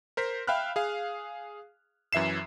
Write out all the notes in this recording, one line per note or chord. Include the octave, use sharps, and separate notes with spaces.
A#4 C5 B6
E5 F5 G5 B5 F6 F#6
G#4 F5
F#2 E3 E5 C7 E7